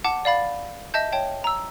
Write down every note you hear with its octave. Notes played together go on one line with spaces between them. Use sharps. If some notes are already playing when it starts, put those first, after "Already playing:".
F#5 A5 D6
D5 F5 B5 A6
D#5 E5 A5 G6
C#5 G5 A5
A#5 E6